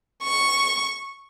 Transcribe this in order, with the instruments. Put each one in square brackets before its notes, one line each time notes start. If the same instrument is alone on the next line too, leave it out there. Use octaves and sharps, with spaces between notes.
[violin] C#6